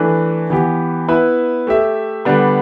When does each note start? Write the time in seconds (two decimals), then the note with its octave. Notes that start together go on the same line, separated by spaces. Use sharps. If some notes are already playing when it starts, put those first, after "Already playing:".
Already playing: E3 A3 D4 B4
0.50 E3 B3 G4
1.08 B3 E4 B4 E5
1.67 A3 G4 E5
2.25 D3 G3 B3 D4 B4